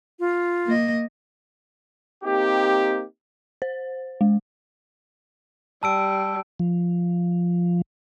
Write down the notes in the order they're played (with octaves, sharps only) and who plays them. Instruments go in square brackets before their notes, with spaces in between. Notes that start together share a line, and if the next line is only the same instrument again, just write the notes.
[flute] F4
[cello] A#3 D#5
[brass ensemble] A#3 C4 D#4 G4
[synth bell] C5
G#3
[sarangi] G3 [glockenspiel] A5 E6 D7
[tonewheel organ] F3